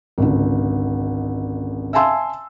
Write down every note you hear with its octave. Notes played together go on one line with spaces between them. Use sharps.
G#1 C#2 D3
E5 F5 G#5 A5 C6 E6